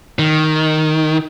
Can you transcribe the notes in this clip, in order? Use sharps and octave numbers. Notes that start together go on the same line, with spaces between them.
D#3